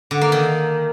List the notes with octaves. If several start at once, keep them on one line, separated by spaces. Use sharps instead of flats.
D3
A#3
D#3